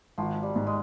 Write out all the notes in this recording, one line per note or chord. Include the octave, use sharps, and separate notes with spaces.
G#1 F3
G3
G#2
G#3